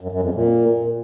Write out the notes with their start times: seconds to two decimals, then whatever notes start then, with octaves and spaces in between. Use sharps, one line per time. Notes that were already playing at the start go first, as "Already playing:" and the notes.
0.01 F#2
0.12 F#2
0.23 F2
0.34 A#2